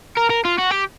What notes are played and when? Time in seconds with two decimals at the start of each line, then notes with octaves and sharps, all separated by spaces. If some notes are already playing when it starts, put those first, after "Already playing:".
0.17 A#4
0.30 A#4
0.45 F4
0.58 F#4
0.71 G4